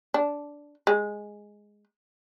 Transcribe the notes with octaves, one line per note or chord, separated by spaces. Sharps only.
D4
G#3